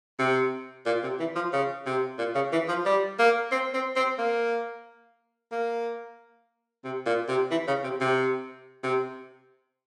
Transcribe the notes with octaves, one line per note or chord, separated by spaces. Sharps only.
C3
A#2
C3
E3
F3
C#3
C3
A#2
C#3
E3
F3
G3
A#3
C4
C4
C4
A#3
A#3
C3
A#2
C3
E3
C#3
C3
C3
C3